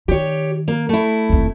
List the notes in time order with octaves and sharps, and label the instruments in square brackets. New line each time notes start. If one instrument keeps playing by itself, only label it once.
[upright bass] D#3 [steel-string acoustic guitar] G4 C#5
[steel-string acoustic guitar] A#3
A3 E4
[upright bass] F1 D#2